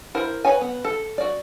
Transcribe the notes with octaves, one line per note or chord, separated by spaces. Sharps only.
E4 A#4 C5
B4 C#5 G#5
B3
A4
F#4 D5